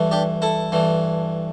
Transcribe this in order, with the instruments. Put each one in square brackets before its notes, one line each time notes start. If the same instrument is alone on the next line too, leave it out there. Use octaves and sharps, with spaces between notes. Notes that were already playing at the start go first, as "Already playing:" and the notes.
Already playing: [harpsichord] G2 E3 A3
D4 G4
E4 A4
G2 E3 A3